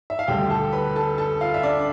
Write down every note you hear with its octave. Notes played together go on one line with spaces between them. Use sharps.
E5
F5
D2 D3 G3 G4 G5
A4 A5
B4 B5
A4 A5
A4 A5
F4 F5
E5
D4 D5